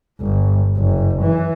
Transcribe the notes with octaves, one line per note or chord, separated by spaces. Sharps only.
G1
F#1
E3